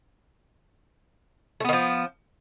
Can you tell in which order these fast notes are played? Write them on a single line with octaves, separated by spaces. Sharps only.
A3 B3 D#3 F3